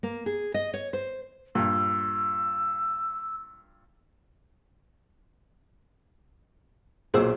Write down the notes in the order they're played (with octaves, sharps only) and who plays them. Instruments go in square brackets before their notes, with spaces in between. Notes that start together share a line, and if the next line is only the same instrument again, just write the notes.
[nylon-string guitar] A#3
G#4
D#5
C#5
C5
[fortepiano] G2 A#2 [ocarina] E6
[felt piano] B1 A#2 E6 [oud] G#4 C5